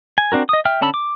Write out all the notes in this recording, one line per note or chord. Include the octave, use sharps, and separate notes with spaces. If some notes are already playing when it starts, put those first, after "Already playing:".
G#5
C4 D4 F#4 A#4
D#5 D#6
E5 G5 F6
D3 C#4 A5 B5 E6
D6